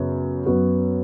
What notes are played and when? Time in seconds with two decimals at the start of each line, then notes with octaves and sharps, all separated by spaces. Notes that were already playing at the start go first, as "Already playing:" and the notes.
Already playing: F#2 C#3 B3
0.46 F#2 F#3 B3 F#4